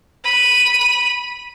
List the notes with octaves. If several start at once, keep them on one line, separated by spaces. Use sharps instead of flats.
B5 D#7